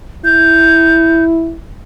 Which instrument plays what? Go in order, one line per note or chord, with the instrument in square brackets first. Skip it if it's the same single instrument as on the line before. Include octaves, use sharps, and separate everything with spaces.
[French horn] E4 [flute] G6